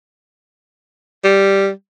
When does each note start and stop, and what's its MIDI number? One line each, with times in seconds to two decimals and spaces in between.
1.24 1.70 55